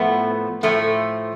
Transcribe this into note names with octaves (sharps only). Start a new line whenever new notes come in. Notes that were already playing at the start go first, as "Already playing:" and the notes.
Already playing: A2 F3 A3 B3
A2 F3 A3